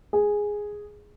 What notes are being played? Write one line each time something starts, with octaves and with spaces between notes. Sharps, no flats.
G#4